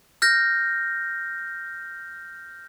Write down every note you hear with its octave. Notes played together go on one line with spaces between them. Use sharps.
F6 G6 A#6